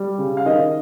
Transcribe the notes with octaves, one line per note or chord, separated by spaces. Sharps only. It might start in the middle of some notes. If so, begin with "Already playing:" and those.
Already playing: G3
C#3
F5
D#3 D#5